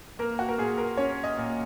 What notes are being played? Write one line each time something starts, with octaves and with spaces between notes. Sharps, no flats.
A#3 A#4
F#4
A#4
A#2 G#4
A#4
C#4 C#5
D#5
A#2